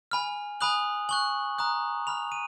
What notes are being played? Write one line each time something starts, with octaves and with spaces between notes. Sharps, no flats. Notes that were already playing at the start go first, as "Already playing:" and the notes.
G#5 B5 F6
G#5 B5 D#6 F#6 F#7
G#5 C#6 F#6 F#7
A#5 D#6 F#6
B5 F6 F7
D#7